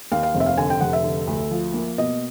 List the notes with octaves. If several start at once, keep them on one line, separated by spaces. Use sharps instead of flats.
D#2 F5
F5
F1
E5
F5
D3 G#5
G5
F1 F#5
E5
D3
D2
F3
A#3
B2 D#5